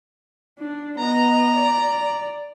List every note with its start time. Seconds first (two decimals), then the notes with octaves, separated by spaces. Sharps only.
0.60 D4
0.99 B3 D#5 A#5
1.56 D5